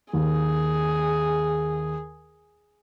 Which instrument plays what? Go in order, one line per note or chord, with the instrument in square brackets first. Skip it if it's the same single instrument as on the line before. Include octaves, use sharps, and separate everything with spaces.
[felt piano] D#2 [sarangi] G#4